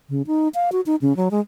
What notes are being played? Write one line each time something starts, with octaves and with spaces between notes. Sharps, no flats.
C#3
D#4
F5
F#4
D#4
C#3
F#3
G#3